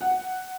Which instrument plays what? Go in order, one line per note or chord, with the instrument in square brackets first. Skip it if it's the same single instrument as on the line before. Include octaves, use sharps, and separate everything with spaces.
[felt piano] F#5